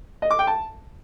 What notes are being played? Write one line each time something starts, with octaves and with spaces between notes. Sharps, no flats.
D#5
D6
G5
A5